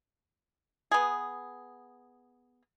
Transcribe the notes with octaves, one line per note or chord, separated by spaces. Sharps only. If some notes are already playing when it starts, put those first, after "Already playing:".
B3 G#4